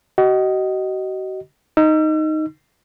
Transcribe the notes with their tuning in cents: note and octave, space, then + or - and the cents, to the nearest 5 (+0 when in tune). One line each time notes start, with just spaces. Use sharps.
F#4 +40 D#5 +0
D#4 +0 E6 +40